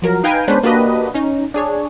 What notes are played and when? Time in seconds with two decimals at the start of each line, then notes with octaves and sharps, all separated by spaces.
0.02 F3 F#3 A#4
0.23 D#4 B4 F5 G5 G#5 A#5
0.48 G#3 B3 C#4 D4 B4 C5
0.63 A#3 D4 F#4 G4 B4 D#5
1.14 C#4 D#4
1.54 D4 G#4 C#5